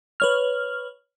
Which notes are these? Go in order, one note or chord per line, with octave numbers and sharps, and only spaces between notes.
B4 C#5 F6